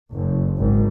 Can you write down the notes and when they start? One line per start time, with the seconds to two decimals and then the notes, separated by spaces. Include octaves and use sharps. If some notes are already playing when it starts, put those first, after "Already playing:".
0.11 F#1
0.57 G#1